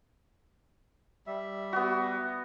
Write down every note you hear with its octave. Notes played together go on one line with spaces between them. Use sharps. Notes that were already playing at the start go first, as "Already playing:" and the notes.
G3 E5
B3 F#4